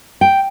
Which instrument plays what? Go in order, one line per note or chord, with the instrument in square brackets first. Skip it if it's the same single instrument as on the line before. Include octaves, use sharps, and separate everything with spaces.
[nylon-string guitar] G5